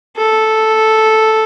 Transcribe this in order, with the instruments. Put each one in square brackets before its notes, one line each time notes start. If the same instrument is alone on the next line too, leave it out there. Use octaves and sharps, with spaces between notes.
[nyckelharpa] A4